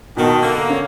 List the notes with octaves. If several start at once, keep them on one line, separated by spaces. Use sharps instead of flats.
B2 D#3 B3 A5
D3 A#3
A#5
C#4